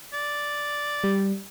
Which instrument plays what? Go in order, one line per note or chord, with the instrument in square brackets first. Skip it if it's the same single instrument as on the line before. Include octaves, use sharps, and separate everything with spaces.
[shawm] D5
[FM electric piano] G3